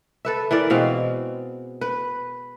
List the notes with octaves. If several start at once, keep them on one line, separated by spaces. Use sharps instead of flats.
A4 B4 E5
E3 A#4 D5
B2 G#3 C4 F5
B4